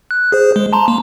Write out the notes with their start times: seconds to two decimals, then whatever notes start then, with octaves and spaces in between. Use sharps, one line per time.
0.11 F#6
0.32 G#4 C5
0.56 G#3
0.73 A5 A#5 C6
0.88 A#3